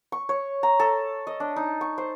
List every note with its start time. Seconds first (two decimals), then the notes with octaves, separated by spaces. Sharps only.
0.12 C#6
0.29 C#5
0.63 A#5
0.80 A4
1.27 D#5
1.40 D4
1.56 D#4
1.81 C#6
1.98 C5